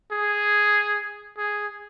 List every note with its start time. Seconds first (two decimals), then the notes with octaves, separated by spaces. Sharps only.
0.11 G#4
1.38 G#4